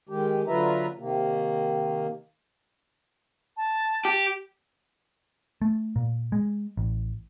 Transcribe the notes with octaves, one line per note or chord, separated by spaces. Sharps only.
D#3 G#3 G4
D3 F#3 F4 B4 E5 A#5
C3 D#3 A#3
A5
G4
A3
A#2
G#3
A1